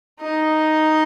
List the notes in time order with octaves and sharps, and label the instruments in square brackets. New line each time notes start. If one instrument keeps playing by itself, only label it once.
[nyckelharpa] D#4 [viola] D#5